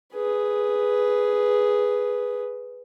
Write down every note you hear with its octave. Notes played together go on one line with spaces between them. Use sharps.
G#4 B4